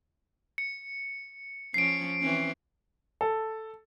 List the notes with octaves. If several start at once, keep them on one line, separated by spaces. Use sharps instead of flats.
C#7
F3 C#4 C7 D7
E3 C4 C#4
A4